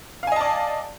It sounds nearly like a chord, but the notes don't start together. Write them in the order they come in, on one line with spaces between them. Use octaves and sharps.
F5 G#5 D#5 A5 D5